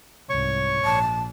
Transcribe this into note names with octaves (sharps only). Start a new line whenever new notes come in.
C2 G#2 C#5 C#6
A#1 A5